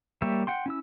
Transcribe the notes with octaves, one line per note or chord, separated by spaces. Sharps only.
G3 A#3 G4 C#5 E5
F#5 G5 C6
C#4 E4 E6